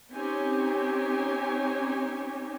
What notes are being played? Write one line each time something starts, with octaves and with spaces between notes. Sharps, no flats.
C4 C#4 D#4 G4 C#5 G#5